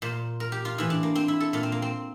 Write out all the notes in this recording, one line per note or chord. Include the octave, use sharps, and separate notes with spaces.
A#2 C5
A#4
G4
F4
A2 E3 E4
D4
A#3
C4
E4
A4
A#2 F4
C4
A#3
C4